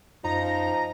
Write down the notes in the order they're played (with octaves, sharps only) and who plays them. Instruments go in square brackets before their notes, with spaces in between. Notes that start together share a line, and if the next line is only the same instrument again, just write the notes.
[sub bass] F#2 [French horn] F3 [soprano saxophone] D#4 [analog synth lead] A#5